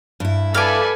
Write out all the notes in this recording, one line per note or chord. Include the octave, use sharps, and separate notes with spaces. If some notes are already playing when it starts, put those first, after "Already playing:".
G2 E4
A4 B4 D5 F5 G#5 D6